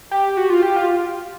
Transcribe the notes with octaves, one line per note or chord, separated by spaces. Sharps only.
G4
F#4
F4
G4
F4